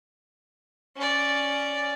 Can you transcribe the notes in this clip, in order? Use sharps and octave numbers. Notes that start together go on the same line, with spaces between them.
C#4 D5